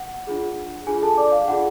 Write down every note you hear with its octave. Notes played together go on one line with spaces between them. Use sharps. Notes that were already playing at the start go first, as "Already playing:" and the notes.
Already playing: F#5
D4 F4 G#4
D4 F4 G#4 G#5
A4 A5
D5 D6
F5
D4 F4 G#4 F#5